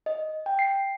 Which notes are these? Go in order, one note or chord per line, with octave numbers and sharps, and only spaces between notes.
D#5
G5
C7